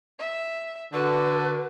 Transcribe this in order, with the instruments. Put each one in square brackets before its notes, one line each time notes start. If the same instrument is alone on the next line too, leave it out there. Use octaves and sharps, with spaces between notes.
[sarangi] E5
[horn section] D3 [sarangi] F#4 [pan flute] B4